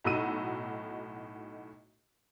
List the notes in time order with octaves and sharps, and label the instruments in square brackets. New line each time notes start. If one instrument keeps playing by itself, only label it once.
[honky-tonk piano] B1 A2 D#4 F#4 E6 D#7